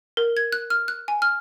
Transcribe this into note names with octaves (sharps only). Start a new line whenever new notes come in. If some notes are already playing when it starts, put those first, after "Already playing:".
A#4
G#6
F#6
F6
F#6
G#5
F6